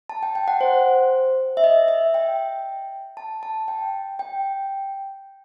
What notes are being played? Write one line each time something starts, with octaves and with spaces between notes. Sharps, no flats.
A5
G5
G5
F#5
C5
E5
D#5
E5
G5
A5
A5
G5
G5